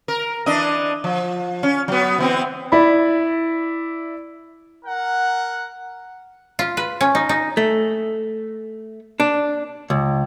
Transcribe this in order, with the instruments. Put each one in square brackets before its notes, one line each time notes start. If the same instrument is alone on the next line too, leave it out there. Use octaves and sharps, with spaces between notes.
[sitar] A#4
E3 D4 D#5
F3
C#4
F#3 B3
E3 B3 C4
[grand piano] E4 D5 B5
[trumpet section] A#4 F#5
[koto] F4
B4
C#4
D#4
D#4
[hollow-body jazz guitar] A3
D4
C#2